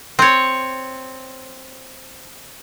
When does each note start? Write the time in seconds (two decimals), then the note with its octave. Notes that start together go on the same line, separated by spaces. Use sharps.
0.19 C4 C#5